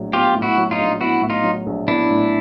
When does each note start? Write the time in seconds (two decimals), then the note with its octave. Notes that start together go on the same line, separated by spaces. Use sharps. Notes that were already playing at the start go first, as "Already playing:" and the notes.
Already playing: A#1 A2 F#3
0.13 B3 F4 G4
0.35 A2
0.42 E4 F#4
0.58 F#3
0.71 D#4 F4
0.78 A#1
1.00 B3 E4 F#4
1.22 A2
1.30 D#4 F4
1.44 F#3
1.66 A#1
1.88 B3 D4 E4
2.10 A2